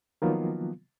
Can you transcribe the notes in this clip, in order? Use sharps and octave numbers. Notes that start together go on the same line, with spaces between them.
D#3 F3 F#3 A#3 B3 F4